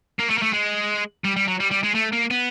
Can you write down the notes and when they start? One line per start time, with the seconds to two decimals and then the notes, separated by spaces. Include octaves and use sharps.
0.19 A#3
0.30 A3
0.38 A#3
0.42 A3
0.53 G#3
1.24 G3
1.36 G3
1.47 F#3
1.60 G3
1.71 G3
1.83 G#3
1.95 A3
2.13 A#3
2.31 B3